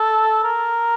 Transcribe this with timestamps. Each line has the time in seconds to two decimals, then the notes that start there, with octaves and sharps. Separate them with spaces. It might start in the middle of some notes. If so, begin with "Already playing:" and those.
Already playing: A4
0.44 A#4